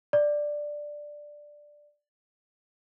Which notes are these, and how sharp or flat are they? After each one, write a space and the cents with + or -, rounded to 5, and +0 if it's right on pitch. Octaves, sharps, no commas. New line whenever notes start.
D5 +5